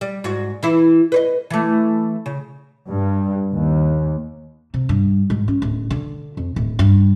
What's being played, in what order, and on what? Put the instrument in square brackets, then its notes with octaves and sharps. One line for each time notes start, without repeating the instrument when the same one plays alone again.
[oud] G3
G#2 F#4
E3 E4
B4 C#5 D#5
E3 A3
C#3
[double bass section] G2
D#2
[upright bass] C3
G2
G#2
C#4
D1
D3
F2
D1
G2